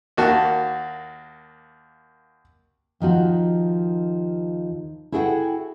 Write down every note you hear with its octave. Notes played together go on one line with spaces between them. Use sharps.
D#2 A#3 F#4 A5
D#2 D#3 F3 F#4
E4 F#4 G#4 A4 F#5 G5